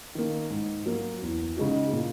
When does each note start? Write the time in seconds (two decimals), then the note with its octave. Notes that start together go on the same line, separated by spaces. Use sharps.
0.15 D#3 A#3
0.50 G#2
0.86 F#3 A#3
1.22 E2
1.57 C#3 G#3 D#4 F#4
1.93 A#2